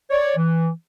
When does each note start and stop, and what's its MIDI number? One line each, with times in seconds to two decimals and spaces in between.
0.10 0.33 73
0.10 0.33 74
0.37 0.70 52